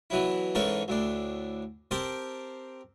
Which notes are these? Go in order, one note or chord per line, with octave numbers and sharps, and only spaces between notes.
B2 E3 F#3 E4
G#2 E3 C#4 A4 A#4 C#6
D2 A2 D4
C4 G4 A#4 G5 A5 C6